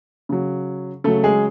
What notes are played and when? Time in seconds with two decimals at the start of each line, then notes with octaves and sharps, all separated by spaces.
0.29 C#3 F#3
1.04 C#3 F#3 A3 A4
1.23 G#3 G#4